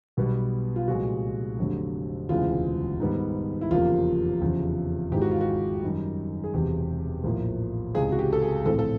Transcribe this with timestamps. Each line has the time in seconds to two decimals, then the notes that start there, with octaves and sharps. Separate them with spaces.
0.17 B1 B2 G3 B3
0.76 F4
0.88 C2 A#2 F3 G#3 F#4
1.58 F1 F2 D3 F#3 A3
2.29 E1 D2 C#3 E3 G#3 F4
3.00 G#2 D#3 G3 B3
3.61 E4
3.71 F1 E2 C#3 F3 A#3 F4
4.41 F1 E2 C#3 F3
5.12 G#1 G#2 E3 G#3 G4
5.22 F#4
5.31 F4
5.41 F#4
5.82 F#2 D#3 G3
6.44 G#4
6.54 E1 E2 C3 G4
7.24 A#1 A2 F3 A#3
7.95 C#2 C3 E3 G#3 G#4
8.12 F#4
8.19 G4
8.33 A4
8.42 G#4
8.65 A#1 A2 E3 A3 C4 A4
8.79 A4